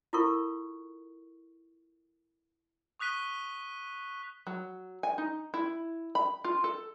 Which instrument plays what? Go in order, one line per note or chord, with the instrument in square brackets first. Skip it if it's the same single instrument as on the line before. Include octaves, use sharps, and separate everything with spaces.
[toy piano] E4 F4 A4 A#4 C#6
[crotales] C#6 D#6 F#6 B6 D#7 G7
[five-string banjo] F#3
G#5
D#4
E4
B5
F4
A4